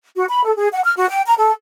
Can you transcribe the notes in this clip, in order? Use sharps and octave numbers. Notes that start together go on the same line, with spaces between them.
F#4
B5
A4
G#4
F#5
F6
F#4
G5
A#5
A4